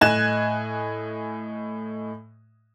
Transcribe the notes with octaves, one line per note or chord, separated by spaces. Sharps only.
A2 D#5 G#5 F#6 G#6 E7